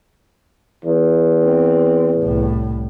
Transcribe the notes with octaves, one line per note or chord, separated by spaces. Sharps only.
E2
C4
C2 A2